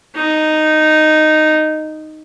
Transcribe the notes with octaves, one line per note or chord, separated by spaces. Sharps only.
D#4